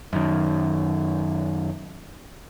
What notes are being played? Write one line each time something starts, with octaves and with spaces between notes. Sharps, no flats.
F#2 D#3